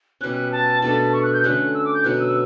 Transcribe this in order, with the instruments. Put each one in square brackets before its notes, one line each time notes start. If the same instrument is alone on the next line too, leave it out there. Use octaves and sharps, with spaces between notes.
[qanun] B2 G3 C#4 [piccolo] F#6
[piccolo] A5
[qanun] B2 A3 D4 A4 [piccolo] A5
[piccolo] C#6
F#6
G6
[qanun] D3 A3 C#4 F#4 [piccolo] F#6
[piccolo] E6
D6
G6
[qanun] B2 F#3 B3 [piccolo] F#6
[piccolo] E6